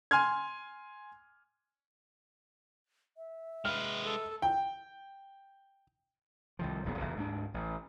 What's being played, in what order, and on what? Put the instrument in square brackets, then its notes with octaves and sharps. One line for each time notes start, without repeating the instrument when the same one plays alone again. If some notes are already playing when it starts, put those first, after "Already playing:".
[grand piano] G#5 C6 F6 G#6
[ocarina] E5
[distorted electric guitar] G#3 B4 [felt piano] F6
[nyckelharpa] A4
[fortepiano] G5
[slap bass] C2 D#3 F3
D#1 A#1 E2 B3
F1 A#1 E2 C#3
D2 G#2 E3 D4
A1